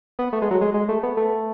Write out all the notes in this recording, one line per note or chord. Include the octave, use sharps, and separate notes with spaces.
B3
A3
G#3
F#3
G#3
G#3
A3
B3
A3